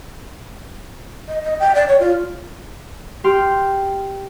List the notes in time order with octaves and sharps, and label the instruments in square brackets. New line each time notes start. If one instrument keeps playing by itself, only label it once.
[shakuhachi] D#5
D#5
G5
D5
C#5
F4
[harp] G4 G5 C6 F6